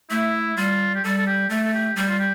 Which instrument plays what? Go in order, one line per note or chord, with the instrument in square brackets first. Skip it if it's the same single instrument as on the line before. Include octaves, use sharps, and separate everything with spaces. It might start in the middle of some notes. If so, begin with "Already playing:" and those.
[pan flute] A3 [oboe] E4
[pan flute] G3 [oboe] F4
[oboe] G4
[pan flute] G3 [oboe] A4
[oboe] A4
G4
[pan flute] A3 [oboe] A4
[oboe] A4
G4
[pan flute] G3 [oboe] G4
[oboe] F4
G4